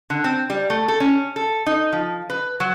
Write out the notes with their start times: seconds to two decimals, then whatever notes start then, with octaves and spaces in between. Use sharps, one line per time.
0.10 D3
0.24 C4
0.50 G3
0.70 A3
0.88 A4
1.00 C#4
1.36 A4
1.66 D#4
1.92 F3
2.30 B4
2.60 F#3